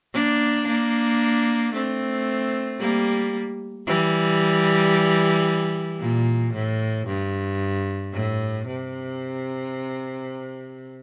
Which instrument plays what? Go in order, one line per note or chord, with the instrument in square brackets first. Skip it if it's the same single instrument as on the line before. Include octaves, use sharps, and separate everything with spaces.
[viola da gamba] A#3 D4
A#3 D4
A3 C4
G3 A#3
E3 G3
A#2
A2
G2
A2
C3